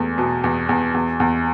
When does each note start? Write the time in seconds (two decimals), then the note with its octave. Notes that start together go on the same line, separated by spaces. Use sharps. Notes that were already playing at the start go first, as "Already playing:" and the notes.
Already playing: E2 A3
0.18 B2
0.44 E2
0.69 E2
0.94 E2
1.20 E2